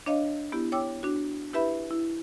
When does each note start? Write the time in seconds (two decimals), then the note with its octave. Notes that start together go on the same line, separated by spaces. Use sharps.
0.06 D4 C#5 D#5 F5
0.52 B3 E4 G4
0.72 C#5 G5 D6 E6
1.03 D4 F#4
1.53 E4 G4 B4 E5 B5
1.91 E4